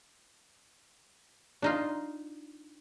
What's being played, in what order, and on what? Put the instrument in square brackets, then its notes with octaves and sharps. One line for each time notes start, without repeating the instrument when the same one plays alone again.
[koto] D4 D#4 F4